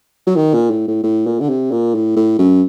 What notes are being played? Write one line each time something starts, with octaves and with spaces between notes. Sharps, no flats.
F#3
D#3
A#2
A2
A2
A2
A#2
D3
C3
A#2
A2
A2
F#2